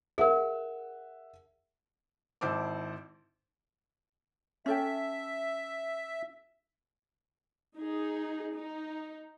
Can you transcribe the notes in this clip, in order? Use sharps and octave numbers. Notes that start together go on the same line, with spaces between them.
G#4 A#4 E5 F#5
G#1 E4 C5 A5 D6
C#4 A4 E5 G5
D#4 G#4
D#4